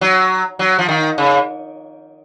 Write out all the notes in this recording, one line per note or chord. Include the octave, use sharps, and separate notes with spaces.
F#3
F#3
F3
D#3
C#3